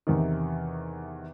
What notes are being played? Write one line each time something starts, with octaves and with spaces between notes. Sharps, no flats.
E2 C3 D#3